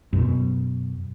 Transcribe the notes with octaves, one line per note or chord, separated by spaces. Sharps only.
F#2 B2